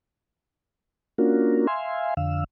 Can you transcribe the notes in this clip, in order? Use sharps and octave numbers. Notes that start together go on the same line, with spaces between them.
A#3 C#4 D4 F4 F#4 A#4
E5 F5 G#5 C6
F2 D3 F5 E6